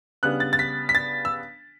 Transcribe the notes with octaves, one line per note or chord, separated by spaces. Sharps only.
C#3 G3 B3 D4 F#6
A6
A6
B6
B6
A6
E6